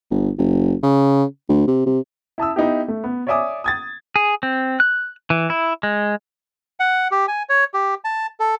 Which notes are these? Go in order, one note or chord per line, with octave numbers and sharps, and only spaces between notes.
G1
F#1
C#3
D2
C3
C3
E4 A5 D#6 E6
B3 D#4 E4 G4
A3
B3
C#5 D5 E5 G#5 D6 D#6
D#6 G#6 A6
G#4
C4
F#6
E3
E4
G#3
F#5
G4
G#5
C#5
G4
A5
A4